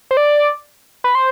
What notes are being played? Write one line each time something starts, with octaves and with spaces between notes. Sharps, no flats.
C5
D5
B4
C5